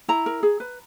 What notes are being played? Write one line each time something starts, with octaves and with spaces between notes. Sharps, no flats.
E4 A#5
A#4
G#4
B4